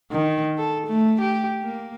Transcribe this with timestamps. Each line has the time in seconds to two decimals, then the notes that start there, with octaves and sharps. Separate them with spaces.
0.11 D#3
0.58 A4
0.87 A3
1.21 G4
1.63 A#3